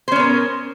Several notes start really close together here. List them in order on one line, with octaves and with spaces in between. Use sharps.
C5 C#4 B3 A#4